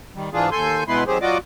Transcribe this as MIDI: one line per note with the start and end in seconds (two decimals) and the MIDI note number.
0.15 0.30 51
0.15 0.30 55
0.33 0.50 44
0.33 0.50 52
0.33 0.50 62
0.33 0.50 65
0.33 0.50 68
0.52 0.84 39
0.52 0.84 69
0.52 0.84 80
0.52 0.84 84
0.52 0.84 91
0.88 1.04 47
0.88 1.04 56
0.88 1.04 59
0.88 1.04 64
0.88 1.04 71
0.88 1.04 84
1.07 1.18 51
1.07 1.18 54
1.07 1.18 60
1.07 1.18 67
1.07 1.18 68
1.07 1.18 72
1.22 1.38 54
1.22 1.38 65
1.22 1.38 66
1.22 1.38 74
1.22 1.38 75
1.22 1.38 86